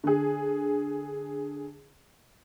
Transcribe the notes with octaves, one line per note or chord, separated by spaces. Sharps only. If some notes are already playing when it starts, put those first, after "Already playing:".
D3 G#4